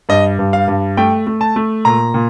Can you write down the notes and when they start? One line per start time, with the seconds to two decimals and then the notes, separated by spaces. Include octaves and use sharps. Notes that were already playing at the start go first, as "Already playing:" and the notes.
0.09 G2 D#5
0.39 G2
0.53 F5
0.68 G2
0.97 A3 G5
1.27 A3
1.41 A5
1.56 A3
1.85 A#2 A#5
2.14 A#2